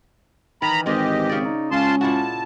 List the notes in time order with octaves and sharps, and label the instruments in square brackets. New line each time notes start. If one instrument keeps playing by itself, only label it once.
[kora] D#3 [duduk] E3 [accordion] A#5 B5
[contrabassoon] G#1 [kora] D#3 C4 [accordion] G4 D#5
[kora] C#3 D5 [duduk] C4
[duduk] D#4
[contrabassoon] C#2 [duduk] C#4 [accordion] F4 A5 C6
[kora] A#2 E4 F#4 [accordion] A5